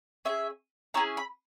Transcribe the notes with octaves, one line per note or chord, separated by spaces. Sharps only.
C#4 E4 G#4 E5
C#4 E4 G#4 A#5
B5